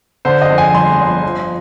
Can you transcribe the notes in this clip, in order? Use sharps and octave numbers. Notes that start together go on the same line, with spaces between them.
D3 C5
D#5
F2
G#5
G1 C6
G1
F3